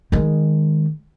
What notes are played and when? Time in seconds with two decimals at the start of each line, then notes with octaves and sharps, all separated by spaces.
0.12 D#3 G#3